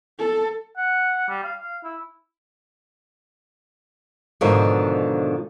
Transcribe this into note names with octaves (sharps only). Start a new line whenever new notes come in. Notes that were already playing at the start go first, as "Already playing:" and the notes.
A4
F#5
G3
F5
F5
E4
G#2 B2 D3 D#3 F3